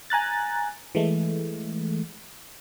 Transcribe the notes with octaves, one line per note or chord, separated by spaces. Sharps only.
G#5 A#5 F#6 A6
E3 G#3 A3